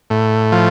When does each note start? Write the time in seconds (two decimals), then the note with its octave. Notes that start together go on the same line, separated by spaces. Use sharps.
0.10 A2
0.52 F3